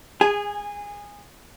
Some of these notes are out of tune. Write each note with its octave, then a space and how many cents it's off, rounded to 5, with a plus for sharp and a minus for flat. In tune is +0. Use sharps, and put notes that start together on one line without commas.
G#4 -20 G#5 +0